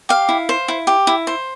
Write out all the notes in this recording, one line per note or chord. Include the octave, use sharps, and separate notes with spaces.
G4 F5
E4
C5
E4
G4
E4
C5